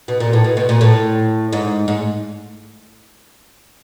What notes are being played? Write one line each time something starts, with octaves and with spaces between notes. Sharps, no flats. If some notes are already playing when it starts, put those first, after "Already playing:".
B2
A#2
A2
B2
B2
A#2
A2
G#2
G#2